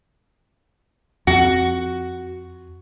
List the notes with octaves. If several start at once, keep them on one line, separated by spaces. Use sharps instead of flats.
F2 F#4